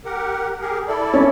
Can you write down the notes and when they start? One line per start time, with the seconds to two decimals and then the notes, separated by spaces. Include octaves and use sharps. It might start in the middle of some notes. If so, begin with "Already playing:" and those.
0.05 G4 A#4 F#5
0.61 G4 G#4 A#4
0.88 E4 A4 D5
1.14 C#4